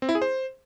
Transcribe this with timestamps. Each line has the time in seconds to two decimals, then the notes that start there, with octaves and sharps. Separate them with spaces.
0.02 C4
0.09 E4
0.15 G#4
0.22 C5